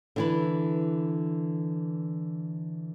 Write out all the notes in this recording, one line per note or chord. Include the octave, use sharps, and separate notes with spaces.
D3 E3 B4